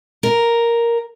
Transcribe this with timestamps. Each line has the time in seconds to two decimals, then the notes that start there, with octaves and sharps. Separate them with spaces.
0.23 A#4